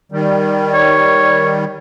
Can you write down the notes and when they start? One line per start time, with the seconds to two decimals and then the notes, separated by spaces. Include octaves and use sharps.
0.12 D#3 G3
0.74 C#5